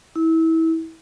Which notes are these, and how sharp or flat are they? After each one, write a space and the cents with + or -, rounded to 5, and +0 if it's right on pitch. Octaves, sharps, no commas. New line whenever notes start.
E4 -25